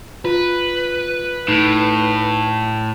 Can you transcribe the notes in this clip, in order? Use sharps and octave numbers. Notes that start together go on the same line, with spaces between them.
F4 B4
A2 D#4